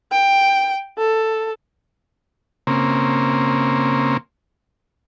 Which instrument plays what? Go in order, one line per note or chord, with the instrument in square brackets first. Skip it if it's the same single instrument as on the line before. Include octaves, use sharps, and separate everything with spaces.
[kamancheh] G5
A4
[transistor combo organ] C#3 A#3 C4